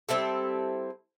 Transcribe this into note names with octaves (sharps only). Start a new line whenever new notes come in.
G3 C4 E4 A4